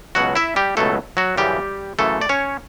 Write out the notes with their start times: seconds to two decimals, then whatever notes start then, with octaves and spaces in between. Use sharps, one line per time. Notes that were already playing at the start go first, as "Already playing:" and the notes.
0.15 C#2 B2 F#3 F#4 F#5
0.35 E4 E5
0.56 G3 G4
0.77 C#2 B2 F#3 A3 A4
1.17 F#3 F#4
1.37 F#2 C#3 E3 G3 G4
1.99 F#2 C#3 E3 A3 A4
2.21 D5
2.29 C#4 C#5